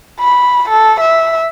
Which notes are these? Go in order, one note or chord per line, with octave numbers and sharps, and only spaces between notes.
B5
A4
E5